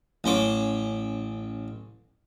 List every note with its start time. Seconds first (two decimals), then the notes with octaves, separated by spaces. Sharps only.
0.24 A1 C#4 C5 D6